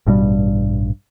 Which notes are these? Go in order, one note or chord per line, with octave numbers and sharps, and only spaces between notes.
A1 G2 B2 G3